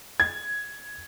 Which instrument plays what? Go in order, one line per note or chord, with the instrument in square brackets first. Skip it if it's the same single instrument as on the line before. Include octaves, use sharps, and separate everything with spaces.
[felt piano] G#6